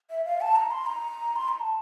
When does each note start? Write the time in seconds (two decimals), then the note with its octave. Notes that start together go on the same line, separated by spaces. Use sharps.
0.11 E5
0.25 F5
0.41 A5
0.56 A#5
0.71 C6
0.86 A#5
1.36 C6
1.48 A#5
1.61 A5